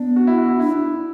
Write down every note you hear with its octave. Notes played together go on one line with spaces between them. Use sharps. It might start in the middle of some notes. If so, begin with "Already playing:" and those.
Already playing: B3 D4
F#4
E4
F#4
E4
D4 E4